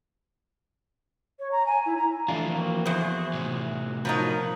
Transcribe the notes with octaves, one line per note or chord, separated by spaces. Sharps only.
C#5
A#5
G#5
E4
A#5
E3 F3 A3 D4 F4
A#3 C4 F#4
E2 F#4 G#4 C5 C6
A2 C3
F3 F#3 D#4 A#4 B5